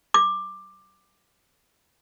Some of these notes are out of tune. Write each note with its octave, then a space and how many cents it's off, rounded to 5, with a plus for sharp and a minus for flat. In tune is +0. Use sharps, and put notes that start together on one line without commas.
D6 +15